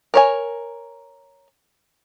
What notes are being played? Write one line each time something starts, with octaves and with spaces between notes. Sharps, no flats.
A#4 C#5 G#5